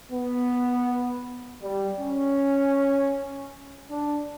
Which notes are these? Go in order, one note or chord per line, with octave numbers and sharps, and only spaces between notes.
B3
G3
C#4
D4